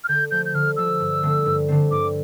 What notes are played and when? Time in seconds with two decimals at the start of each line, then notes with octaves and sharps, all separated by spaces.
0.04 F6
0.09 D3 G6
0.31 F3 A3 G6
0.45 G6
0.55 D3 F6
0.77 F3 A3 E6
1.00 G2
1.23 D3 A3 C4
1.46 G2
1.68 D3 A3 C4
1.91 G2 D6